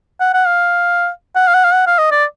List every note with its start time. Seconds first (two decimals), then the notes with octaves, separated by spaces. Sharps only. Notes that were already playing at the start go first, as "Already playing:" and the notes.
0.20 F#5
0.34 F#5
0.46 F5
1.35 F#5
1.48 F5
1.54 F#5
1.64 F5
1.73 F#5
1.87 F5
1.98 D#5
2.11 D5